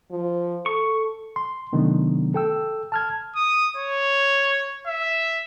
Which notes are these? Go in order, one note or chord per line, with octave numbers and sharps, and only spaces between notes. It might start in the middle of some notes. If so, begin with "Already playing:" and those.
F3
A4 C#6
C6
C3 D#3 F#3 A3 B3 D4
A4 G5 E6
A5 F6 G#6
D#6
C#5
E5